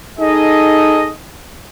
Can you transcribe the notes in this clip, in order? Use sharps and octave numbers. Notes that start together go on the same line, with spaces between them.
D#4 G#4 A4 D#5